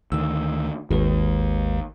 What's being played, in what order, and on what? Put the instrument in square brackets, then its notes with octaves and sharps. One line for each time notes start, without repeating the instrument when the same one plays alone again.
[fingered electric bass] D2 D#3 [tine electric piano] E6
[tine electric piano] G#1 G#3 B4 [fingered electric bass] D#2